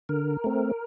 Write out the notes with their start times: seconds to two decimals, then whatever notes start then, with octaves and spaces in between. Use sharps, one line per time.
0.09 D3 A#4
0.44 A3 C4